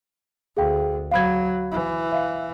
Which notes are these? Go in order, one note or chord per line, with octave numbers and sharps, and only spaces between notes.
D2 G#4 F5 G5
F#3 F5 B5 G#6
E3
E5 F5